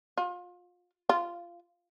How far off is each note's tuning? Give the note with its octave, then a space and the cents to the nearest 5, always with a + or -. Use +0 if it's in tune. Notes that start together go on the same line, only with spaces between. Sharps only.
F4 +30
F4 -15